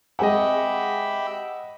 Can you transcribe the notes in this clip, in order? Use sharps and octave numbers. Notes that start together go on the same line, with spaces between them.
G#3 C4 G4 D#5 E5 F#5 G#5 B5